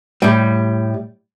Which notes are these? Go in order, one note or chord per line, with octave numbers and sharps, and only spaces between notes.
A2 G3